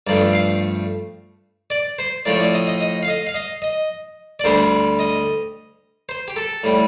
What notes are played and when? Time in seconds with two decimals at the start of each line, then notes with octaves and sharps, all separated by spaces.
0.07 G2 F3 A3 D5
0.33 F5
1.70 D5
1.99 C5
2.25 A2 F3 A3 D5
2.39 D5
2.54 D#5
2.67 D#5
2.81 D#5
3.03 F5
3.08 D#5
3.27 F5
3.34 D#5
3.62 D#5
4.40 D5
4.44 D2 D3 G3 C5
4.99 D#5
6.09 C5
6.28 G4
6.36 A4
6.64 A2 G3